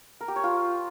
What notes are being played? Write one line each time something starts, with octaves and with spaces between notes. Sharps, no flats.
A#4
G4
C#5
F4